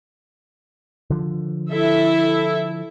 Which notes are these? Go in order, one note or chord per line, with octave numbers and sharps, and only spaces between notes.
D3 F3
E4 A4 E5